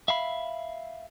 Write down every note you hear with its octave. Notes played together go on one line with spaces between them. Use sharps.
E5 F5 B5